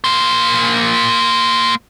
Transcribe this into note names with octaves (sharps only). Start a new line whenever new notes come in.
A#3 C5